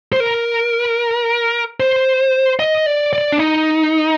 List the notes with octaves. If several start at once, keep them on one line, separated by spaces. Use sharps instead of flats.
C5
A#4
C5
D#5
D5
D5
D4
D#4